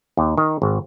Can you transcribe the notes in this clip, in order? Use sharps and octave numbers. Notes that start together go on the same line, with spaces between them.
D#2
D#3
G#1